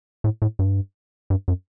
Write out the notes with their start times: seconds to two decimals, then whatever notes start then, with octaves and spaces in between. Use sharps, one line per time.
0.24 A2
0.42 A2
0.59 G2
1.30 G2
1.48 F#2